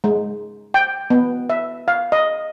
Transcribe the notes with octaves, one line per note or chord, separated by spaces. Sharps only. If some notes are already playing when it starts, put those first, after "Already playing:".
G#3
G5
B3
E5
F5
D#5